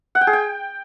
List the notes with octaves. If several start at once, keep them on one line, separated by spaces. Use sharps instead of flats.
F#5
G5
G#4
G5